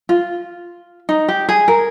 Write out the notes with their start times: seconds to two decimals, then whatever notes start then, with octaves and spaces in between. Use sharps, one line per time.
0.09 F4
1.09 D#4
1.29 G4
1.49 G#4
1.68 A#4